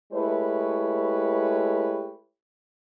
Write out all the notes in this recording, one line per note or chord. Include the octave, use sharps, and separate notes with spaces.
G#3 A3 E4 G4 B4 C#5